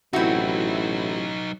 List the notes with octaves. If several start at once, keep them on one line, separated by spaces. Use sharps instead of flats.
A1 F#3 C4 D#4 E4 F#4